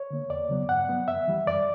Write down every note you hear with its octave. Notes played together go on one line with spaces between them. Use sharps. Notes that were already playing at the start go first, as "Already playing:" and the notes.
Already playing: C#5
D3 A#3
E2 D5
C#3 F#3 B3
G2 F#5
F#3 B3
F#2 E5
E3 G3
F#2 D5